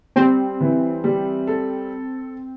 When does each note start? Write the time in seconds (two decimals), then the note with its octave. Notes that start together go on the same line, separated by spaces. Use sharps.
0.16 G3 C4
0.61 E3
1.04 G3
1.47 A4